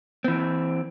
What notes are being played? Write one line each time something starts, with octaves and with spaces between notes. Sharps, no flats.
E3 C4